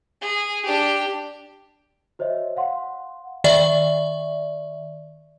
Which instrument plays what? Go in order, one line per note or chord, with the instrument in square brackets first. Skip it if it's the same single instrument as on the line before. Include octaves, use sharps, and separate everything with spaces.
[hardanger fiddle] G#4
D4 G4
[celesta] F#4 C5 C#5 D#5 E5
F5 F#5 C6
[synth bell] D#3 D5 E5